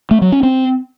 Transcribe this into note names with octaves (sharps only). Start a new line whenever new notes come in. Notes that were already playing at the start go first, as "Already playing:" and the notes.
A3
F#3
C#4
C4